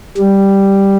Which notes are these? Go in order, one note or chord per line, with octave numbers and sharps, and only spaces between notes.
G3